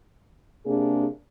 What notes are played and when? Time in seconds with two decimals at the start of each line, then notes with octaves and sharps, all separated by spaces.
0.66 C3 A#3 D4 G#4